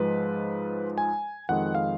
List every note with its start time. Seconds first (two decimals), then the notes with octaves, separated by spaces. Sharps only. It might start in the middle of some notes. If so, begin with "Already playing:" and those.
Already playing: G#2 F3 G#3 B4
0.98 G#5
1.49 F2 D#3 G#3 F#5
1.75 F5